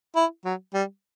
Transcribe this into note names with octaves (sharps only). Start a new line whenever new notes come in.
E4
F#3
G3